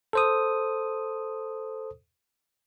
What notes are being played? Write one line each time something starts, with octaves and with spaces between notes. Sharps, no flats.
A4 C5 D#6